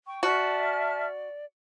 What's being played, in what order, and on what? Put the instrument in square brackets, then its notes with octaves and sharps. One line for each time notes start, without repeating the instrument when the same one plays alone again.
[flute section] G5 C#6
[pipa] F#4 [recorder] D5 [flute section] E5 A5 F6